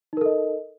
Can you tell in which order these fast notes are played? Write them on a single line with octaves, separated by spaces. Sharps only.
D#4 A#4 A4 D#5